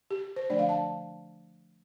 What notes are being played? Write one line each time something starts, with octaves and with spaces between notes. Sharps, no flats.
G4
C5
D3 F3 A3 D4 D5
F5
A5